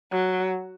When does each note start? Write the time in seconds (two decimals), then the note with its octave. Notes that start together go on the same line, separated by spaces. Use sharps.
0.12 F#3